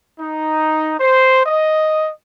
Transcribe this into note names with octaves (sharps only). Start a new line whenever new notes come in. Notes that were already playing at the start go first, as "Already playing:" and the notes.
D#4
C5
D#5